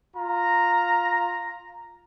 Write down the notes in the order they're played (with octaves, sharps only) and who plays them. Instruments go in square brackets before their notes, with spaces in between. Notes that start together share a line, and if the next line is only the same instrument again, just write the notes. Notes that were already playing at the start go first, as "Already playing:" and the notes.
[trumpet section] F4 A#5